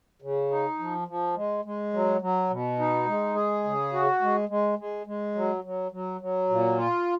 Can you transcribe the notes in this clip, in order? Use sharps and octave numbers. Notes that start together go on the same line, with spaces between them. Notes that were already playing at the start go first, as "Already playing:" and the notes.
C#3
D#4
F3
F3
G#3
G#3
F#3
F#3
B2
D#4
G#3
G#4
C#3
F#4
G#3
G#3
G#3
G#3
F#3
F#3
F#3
F#3
A#2
F4